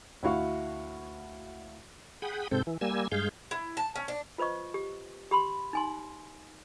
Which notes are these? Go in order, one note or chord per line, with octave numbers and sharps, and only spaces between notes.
D2 E4 F#4 F5 C#6
G#4 F#5 G5 B5 D#6
G#2 C3 C4 A4 G6
E3
G3 A#3 G#5 E6
G2 G#3 G#4 F5 G6
E4
A5
C#4
D4
F4 B4 C5 D#5 C#6
G4
G4 B5 C6
D#4 G#5 C6